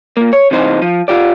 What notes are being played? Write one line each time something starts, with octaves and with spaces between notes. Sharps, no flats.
A#2 A#3
C#5
C3 E3 D#4 C5
F3
F4 G4 D5